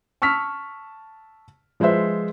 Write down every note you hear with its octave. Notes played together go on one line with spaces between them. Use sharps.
A5 C#6 E6 F6 B6
F3 G#3 B4 C5 E5